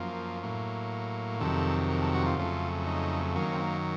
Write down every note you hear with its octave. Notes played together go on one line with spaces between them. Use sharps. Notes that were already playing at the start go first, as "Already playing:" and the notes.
Already playing: F#2 F3 A#3
A2 F#3 A#3
F2 C3 D#3 F#3 A4
A#4
A4
F#4
F4
F2 C#3 F#3 A3
D#4
F#2 D#3 F#3 A#3 C#4
C4
A#3